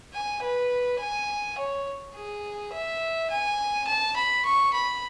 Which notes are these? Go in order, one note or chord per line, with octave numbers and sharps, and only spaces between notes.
G#5
B4
G#5
C#5
G#4
E5
G#5
A5
B5
C#6
B5